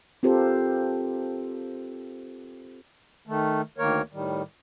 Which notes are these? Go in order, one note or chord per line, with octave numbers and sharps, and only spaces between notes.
C4 F4 G4 A4 A#4 C5
D#3 A3
D2 D#3 A#3 A#4 C#5
A2 D#3 G3